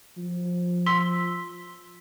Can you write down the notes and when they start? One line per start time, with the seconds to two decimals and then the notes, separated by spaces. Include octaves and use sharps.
0.18 F3
0.86 C6 E6 B6